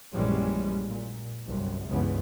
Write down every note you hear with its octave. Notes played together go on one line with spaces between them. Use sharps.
A#1 F#2 E3 G3 G#3 C#4
A#2
G1 C2 F#2
F#1 C#2 G2 C#3 E3 B3